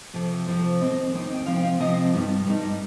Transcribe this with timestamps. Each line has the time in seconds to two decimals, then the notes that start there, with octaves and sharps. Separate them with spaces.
0.14 F2 C3 F3 C4
0.47 F2 C3 F3 C4 C5
0.80 D#2 D#3 C4 D#4 D#5
1.14 D#2 D#3 C4 D#4
1.34 G5
1.46 C3 F3 C4 F5
1.56 G5
1.63 F5
1.80 C3 F3 C4 D#5
2.14 G2 G3 D#4
2.46 G2 G3 D#4